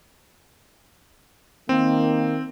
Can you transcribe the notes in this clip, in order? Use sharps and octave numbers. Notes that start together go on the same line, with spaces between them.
D#3 A#3 C4